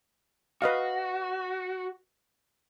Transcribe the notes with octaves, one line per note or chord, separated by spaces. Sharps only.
F#4 B4 D#5 F5